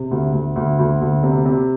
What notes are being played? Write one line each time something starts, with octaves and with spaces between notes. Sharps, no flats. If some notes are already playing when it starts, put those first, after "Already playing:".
Already playing: C3
D2
D2
D2
D2
D2
C3
C3